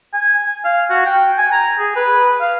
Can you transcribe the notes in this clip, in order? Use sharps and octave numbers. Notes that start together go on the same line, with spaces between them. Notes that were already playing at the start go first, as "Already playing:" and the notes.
G#5
F5
F#4
G5
G#5
A#5
G#4
B4
F5